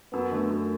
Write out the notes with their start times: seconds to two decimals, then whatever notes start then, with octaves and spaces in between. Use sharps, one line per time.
0.13 F#2 B3
0.31 D3 A3
0.50 F#2